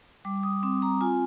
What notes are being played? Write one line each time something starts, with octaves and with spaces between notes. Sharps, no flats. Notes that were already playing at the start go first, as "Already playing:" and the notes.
G3 D6
D#6
C4 D6
A#5
F4 G#5